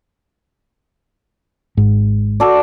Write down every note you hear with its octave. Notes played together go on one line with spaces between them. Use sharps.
G#1 G#2
F#4 A4 D5